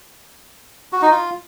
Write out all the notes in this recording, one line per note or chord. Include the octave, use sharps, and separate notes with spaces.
F#4
D#4
F4